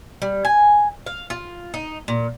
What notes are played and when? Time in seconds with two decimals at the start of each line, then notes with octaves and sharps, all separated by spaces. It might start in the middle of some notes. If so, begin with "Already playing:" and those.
0.22 G3
0.45 G#5
1.06 F5
1.30 F4
1.74 D#4
2.08 A#2